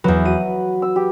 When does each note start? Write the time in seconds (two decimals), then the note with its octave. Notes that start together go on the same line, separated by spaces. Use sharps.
0.04 E2 F#3 B4 F#5
0.25 F#4 D#7
0.82 E6
0.96 G4